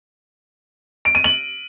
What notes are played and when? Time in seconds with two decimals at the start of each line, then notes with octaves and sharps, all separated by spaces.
1.05 D7
1.15 D#7
1.24 F#7